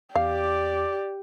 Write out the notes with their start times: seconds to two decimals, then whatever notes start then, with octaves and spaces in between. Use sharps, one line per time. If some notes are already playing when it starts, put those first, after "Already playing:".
0.15 E2 G4 D5 F5